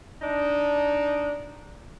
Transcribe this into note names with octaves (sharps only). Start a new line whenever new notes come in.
D4 D#4